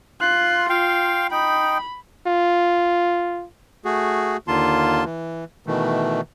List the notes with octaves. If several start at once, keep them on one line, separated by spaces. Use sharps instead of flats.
F4 C6 F#6
F4 F5 G5 C6
D#4 G5 B5
F4
A3 F#4 G#4
D#2 D3 A#3 F4 A5 C6
E3
B2 D#3 E3 A3